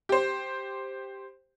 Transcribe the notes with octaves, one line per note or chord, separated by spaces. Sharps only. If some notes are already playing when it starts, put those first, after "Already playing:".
G4 C5